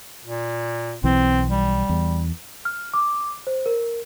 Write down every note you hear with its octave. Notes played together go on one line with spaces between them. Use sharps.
A#2
B1 E3 C4
G3
E2
F6
D6
C5
A#4